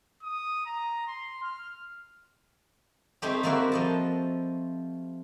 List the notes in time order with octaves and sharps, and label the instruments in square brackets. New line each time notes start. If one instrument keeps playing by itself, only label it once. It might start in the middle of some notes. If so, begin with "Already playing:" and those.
[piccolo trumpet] D#6
A#5
C6
F6
[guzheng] G3 A3 C4 D#4 G4 G#4
G3 A3 A#3 C4 E4 F#4
F3 D#5 A5